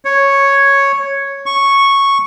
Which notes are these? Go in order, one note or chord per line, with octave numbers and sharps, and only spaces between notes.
C#5
C#6